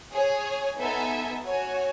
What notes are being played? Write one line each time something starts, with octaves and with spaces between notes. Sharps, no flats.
G#4 C#5 G#5
B3 D#4 A4 E5 G#5
F#4 C#5 G#5